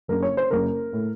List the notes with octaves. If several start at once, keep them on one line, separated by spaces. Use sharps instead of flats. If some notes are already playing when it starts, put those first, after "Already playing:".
F#1 F#2 C#3 A#4
C#5
C5
F#1 F#2 C#3 A#4
A2